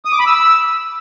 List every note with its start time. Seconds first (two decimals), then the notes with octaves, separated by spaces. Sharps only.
0.05 D#6
0.12 D6
0.19 B5
0.26 E6